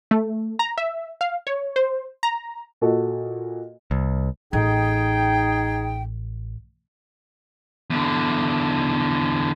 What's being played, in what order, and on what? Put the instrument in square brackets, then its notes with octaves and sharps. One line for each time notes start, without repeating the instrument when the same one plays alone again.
[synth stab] A3
A#5
E5
F5
C#5
C5
A#5
[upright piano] A#2 F#4 A4 D#5
[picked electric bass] C2
[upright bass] A1 [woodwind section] D#4 G#4 G5
[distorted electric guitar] E2 D3